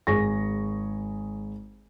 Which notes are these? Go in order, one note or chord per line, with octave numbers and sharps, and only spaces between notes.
G#1 G#4 C#6 A#6